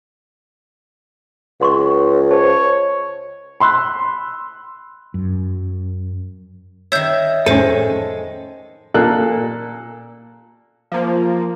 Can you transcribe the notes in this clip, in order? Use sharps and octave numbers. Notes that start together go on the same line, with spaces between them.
C#2 F#5 C6 C#6
G#4 C5 C#5 A5
B5 C6 E6 F#6
F#2
D#3 C#5 E5 G6
F2 A2 G#3 C#4 A4 C5 D#7
A#2 A#3 A4 F#6
F3 A#3